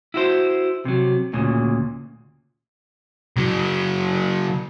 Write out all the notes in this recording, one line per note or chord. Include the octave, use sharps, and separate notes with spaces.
E4 F#4 C5
C3 F#3
D2 A#2 C#3
C#3 F#3